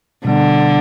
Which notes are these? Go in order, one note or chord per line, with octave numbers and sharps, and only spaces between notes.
B2 D3 G3 B3